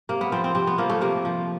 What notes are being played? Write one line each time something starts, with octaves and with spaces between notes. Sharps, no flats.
C3 A#3
B3
F3 C4
C4
C3 C4
B3
F3 A#3
A3
C3 A#3
F3